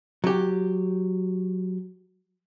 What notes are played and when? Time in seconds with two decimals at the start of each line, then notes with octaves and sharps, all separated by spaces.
0.24 F#3 G4